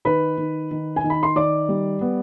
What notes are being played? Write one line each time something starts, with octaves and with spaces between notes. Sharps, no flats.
D#3 B4 B5
D#3
D#3
G#5
D#3
B5
C6
D#3 D5 D6
G3
B3